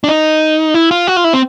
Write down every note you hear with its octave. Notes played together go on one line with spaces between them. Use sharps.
D4
D#4
E4
F4
F#4
F4
E4
C4